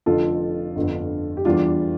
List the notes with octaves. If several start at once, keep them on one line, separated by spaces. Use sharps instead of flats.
F1 F2 D3 F4 A4
G1 F2 D3
G4
E2 E3 G3 D4 F4